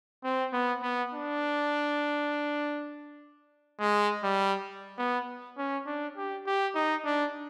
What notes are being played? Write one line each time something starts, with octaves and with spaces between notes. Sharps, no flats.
C4
B3
B3
D4
G#3
G3
B3
C#4
D4
G4
G4
D#4
D4